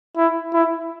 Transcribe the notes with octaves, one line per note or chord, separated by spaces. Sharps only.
E4
E4